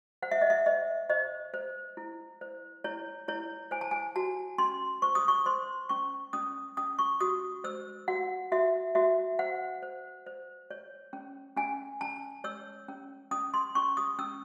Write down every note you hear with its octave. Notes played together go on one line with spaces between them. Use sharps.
C5 F#5
E5
D#5
E5
C5 D#5
C5 D#5
C5
E4
C5
E4 C#5
E4 C#5
C5 G#5
A5
G#5
F#4 A5
C#4 C6
C5 C#6
D#6
C#6
C5 C6
C#4 C#6
C#4 D#6
C#4 D#6
C#6
F#4 D#6
C5 E6
F#4 F#5
F#4 E5
F#4 E5
C5 F#5
C5
C5
C#5
C#4
C#4 G#5
C#4 A5
C#5 E6
C#4
C#4 D#6
C6
C#4 C#6
D#6
C#4 E6